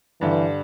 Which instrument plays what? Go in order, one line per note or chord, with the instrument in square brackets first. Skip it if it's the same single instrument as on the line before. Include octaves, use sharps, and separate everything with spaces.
[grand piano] G2 D3 G3 [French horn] E3